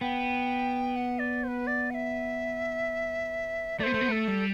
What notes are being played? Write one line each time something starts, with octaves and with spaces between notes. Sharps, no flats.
B3 G5
F#5
D5
C5
B4
D5
F#5
E5
A3 D5
B3 C5
A3
B3
A3 A4
G3